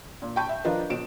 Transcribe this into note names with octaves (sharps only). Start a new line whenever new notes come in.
A#2
G5 A5 B5 C#6 G6
E5
F3 D4 F4 A#4 B4 D#5
B1 B2 D7 E7